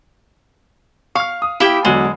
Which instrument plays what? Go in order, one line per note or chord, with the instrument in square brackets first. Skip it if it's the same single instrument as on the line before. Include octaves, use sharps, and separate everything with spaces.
[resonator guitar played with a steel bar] F5 [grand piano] C#6 F6
[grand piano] D#6
[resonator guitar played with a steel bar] E4 G4 [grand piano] F5 G5
[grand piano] E2 D3 F#3 [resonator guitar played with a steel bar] G#3